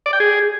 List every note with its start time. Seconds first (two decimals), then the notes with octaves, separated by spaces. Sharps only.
0.06 D5
0.13 G5
0.20 G#4